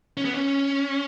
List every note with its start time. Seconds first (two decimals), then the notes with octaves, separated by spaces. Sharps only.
0.17 C#4
0.25 B3
0.34 C#4